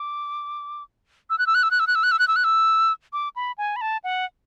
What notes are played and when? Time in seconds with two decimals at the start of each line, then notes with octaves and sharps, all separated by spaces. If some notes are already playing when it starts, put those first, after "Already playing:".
Already playing: D6
1.30 E6
1.39 F#6
1.47 E6
1.55 F#6
1.63 E6
1.71 F#6
1.80 E6
1.87 F#6
1.95 E6
2.03 F#6
2.12 E6
2.19 F#6
2.28 E6
2.36 F#6
2.44 E6
3.13 D6
3.36 B5
3.58 G#5
3.76 B5
3.81 A5
4.04 F#5